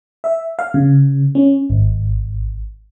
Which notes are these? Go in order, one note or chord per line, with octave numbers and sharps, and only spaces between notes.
E5
F5
C#3
C#4
G#1